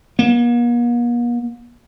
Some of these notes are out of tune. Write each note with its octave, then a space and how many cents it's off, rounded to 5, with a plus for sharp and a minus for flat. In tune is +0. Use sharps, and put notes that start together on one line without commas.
A#3 +45